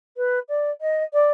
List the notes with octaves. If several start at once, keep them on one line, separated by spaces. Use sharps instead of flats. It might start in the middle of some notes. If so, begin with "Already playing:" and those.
B4
D5
D#5
D5